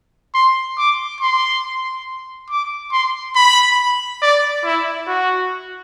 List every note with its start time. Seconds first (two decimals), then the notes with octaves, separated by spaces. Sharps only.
0.34 C6
0.78 D6
1.21 C6
2.50 D6
2.92 C6
3.36 B5
4.22 D5
4.64 E4
5.07 F#4